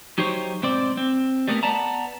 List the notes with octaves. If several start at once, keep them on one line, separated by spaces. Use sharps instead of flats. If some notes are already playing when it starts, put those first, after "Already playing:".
F#3 D#4 G4 C5 C#5
B1 G#2 C4 C5 D5
C4
G3 A3 B3 G#4 A#4
B3 D5 A5 A#5